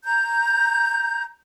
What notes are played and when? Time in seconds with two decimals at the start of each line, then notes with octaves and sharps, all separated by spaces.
0.04 A#5 G6